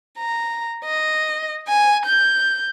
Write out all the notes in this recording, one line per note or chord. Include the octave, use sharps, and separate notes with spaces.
A#5
D#5
G#5
G6